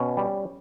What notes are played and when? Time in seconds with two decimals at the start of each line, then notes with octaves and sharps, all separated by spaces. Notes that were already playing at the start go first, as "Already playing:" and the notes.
Already playing: B2 C#4
0.17 G3